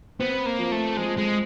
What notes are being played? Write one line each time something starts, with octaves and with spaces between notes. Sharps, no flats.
B3 C4
A#3
F3
A3
F3 G#3
G#3